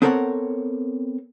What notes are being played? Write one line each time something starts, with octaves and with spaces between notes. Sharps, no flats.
B3 C4 A4 A#4 C#5 F#5